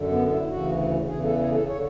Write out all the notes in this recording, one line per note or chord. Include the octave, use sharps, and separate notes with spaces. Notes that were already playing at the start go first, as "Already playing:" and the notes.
Already playing: F#2 D3
B3
E4
D2 C#3 E3 F#4
E2 C#3 E3 G#4
A4
G#4
A4
D3 C#5